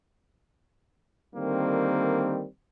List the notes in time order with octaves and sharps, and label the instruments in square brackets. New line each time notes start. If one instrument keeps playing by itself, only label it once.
[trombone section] D3 D#3 G3 A#3 C4